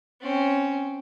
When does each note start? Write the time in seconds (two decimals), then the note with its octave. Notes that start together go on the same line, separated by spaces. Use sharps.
0.21 C4 C#4